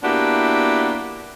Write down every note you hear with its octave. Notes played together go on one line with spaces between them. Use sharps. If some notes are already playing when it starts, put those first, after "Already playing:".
A#3 B3 D4 E4 F#4 G4